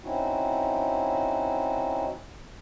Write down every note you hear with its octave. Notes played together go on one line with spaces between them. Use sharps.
C4 C#4 D#4 E4 F#4